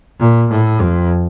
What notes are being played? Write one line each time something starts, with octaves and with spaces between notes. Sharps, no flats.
A#2
A2
F2